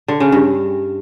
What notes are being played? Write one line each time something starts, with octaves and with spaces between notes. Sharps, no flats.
D3
C#3
G2